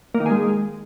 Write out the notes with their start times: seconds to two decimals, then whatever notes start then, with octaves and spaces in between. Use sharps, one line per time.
0.14 A#3
0.20 D#3
0.26 G#4
0.31 G#3